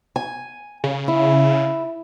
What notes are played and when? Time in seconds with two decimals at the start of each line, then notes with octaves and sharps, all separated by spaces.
0.16 G#5
0.84 C#3
1.08 E4